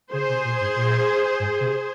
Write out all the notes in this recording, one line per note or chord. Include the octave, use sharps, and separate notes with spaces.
C#3 G#4 C5
C3
A#2
G#2
A#2
G#2
C3